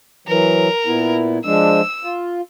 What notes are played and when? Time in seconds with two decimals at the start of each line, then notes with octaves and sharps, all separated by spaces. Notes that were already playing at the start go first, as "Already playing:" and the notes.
0.28 E3 F#3 A#4
0.86 A#2 B3 E4
1.45 F3 G#3 D4 E6
2.04 F4